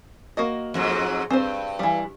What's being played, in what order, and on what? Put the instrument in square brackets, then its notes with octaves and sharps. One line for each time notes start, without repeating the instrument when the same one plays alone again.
[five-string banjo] A#3 F#4 D#5
[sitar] F2 G#2 F#3
[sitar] G2 [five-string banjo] C4 C5
[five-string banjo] E3 G3